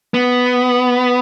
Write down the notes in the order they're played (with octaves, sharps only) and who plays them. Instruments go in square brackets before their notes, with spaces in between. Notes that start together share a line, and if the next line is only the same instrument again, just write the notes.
[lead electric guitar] B3